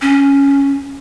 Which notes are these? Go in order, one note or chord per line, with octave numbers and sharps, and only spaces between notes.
C#4